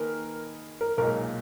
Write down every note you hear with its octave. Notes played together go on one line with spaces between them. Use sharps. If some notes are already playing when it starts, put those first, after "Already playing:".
Already playing: D#3 A#3 D#4 G#4 A#4 B4
A#4
B1 A#2 G#3 D#4 A#4